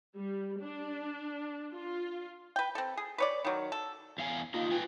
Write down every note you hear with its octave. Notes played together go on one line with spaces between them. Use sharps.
G3
D4
F4
B4 G5
C4 A4
G#4
B4 C#5 D5
D#3 F#3
A4
E2 F5 G#5
A#3 D4 D#4 F4
B4 G5 G#5